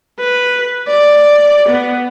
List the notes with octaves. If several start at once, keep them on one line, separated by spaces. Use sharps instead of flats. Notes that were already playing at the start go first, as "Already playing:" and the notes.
B4
D5
B3